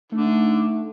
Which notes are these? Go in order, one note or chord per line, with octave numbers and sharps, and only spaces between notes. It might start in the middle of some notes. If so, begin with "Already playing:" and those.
D3 A3 D#4